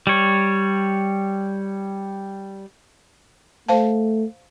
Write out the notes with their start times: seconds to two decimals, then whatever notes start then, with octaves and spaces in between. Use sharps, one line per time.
0.07 G3 C#5
3.69 A3 C5 F5 A5